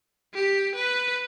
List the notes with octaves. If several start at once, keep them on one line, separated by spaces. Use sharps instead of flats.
G4
B4